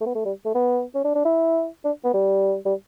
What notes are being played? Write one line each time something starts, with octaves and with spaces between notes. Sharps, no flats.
A3
B3
A3
G3
A3
B3
C#4
D4
D4
E4
D4
B3
G3
G3